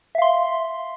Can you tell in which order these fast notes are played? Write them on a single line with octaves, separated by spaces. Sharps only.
E5 F5 C6